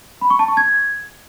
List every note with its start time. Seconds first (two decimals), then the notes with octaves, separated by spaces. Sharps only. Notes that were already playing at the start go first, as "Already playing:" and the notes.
0.21 B5
0.30 C#6
0.39 A5
0.48 C#6
0.57 G#6